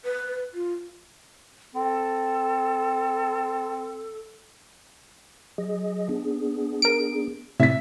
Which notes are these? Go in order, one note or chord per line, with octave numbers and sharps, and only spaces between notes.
B4
F4
C4 A4
F#3 G#4 D#5
B3 D4 G#4
A#4 D7
A2 C3 E5 B6